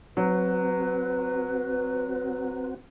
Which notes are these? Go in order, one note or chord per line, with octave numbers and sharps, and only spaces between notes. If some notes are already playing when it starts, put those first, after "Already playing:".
F#3 C4 F#4 B4